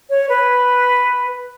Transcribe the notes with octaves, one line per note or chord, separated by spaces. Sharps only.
C#5
B4